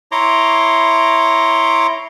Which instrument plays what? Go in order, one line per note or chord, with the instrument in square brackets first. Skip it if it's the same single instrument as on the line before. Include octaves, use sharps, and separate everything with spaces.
[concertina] E4 C#5 A#5 C6 D6